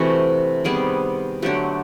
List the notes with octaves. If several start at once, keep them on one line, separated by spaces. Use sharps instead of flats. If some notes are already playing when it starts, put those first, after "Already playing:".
Already playing: C3 E3 A3 F#4
C3 D#3 G3 B3 G#4
D3 F#3 A3 G4